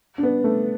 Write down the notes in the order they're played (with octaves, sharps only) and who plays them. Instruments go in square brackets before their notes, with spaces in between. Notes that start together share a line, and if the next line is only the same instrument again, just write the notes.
[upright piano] D4
B3
A3